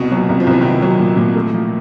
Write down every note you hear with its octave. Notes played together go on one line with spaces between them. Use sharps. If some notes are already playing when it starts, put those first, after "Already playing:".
Already playing: C2 B2
F#3
A#2
C2
F3
C2 E3
C2 D#3
E3
F#3
A#2
A#2
A3
F3